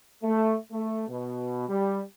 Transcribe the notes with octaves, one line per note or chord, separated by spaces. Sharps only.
A3
A3
B2
G3